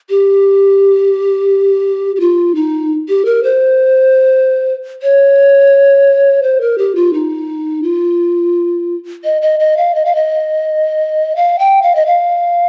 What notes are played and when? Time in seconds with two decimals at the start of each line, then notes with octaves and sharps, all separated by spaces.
0.10 G4
2.16 G4
2.20 F4
2.55 D#4
3.09 G4
3.25 A#4
3.43 C5
5.02 C#5
6.43 C5
6.61 A#4
6.78 G4
6.95 F4
7.13 D#4
7.83 F4
9.24 D#5
9.42 D#5
9.60 D#5
9.77 F5
9.95 D#5
10.05 F5
10.15 D#5
11.36 F5
11.59 G5
11.82 F5
11.95 D#5
12.06 F5